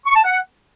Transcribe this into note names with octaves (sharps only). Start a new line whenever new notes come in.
C#6
A5
F#5